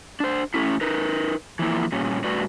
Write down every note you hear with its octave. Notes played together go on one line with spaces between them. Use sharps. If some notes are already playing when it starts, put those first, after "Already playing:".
D4 C5
A2 A3 C#4 E4
D#4 A#4 B4
E3 F3 A#3 E4
G2 A#2 C#4
G2 A3 F#4 B4 D5